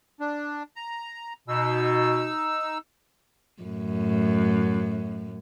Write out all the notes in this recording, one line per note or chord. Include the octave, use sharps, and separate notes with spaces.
D4
A#5
B2 D#4 E6
F#2 A2